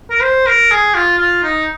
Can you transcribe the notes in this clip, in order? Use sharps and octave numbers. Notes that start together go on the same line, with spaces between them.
A#4
C5
A#4
G#4
F4
F4
D#4